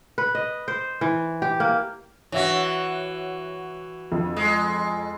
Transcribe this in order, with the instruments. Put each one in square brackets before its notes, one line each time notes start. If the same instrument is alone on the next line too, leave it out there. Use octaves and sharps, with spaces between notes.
[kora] B4
D#5
C5
E3
G4
A#3
[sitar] E3 F#4 [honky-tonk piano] C#5 E5 F#5
[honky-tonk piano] F2
[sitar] G#3